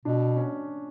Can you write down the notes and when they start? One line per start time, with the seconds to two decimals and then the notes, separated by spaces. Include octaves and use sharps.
0.05 B2 D4
0.37 C#4